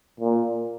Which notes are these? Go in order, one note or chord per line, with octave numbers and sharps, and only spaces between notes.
A#2